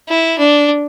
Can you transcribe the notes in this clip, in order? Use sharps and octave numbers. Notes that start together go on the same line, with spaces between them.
E4
D4